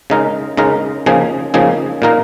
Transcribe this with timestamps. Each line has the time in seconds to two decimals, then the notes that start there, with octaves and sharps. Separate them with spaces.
0.10 C#3 G#3 D#4 A#4
0.57 C#3 G#3 D#4 A#4
1.06 C#3 F3 A#3 D#4 G#4
1.54 C#3 F3 A#3 D#4 G#4
2.02 A#2 A#3 D#4 A#4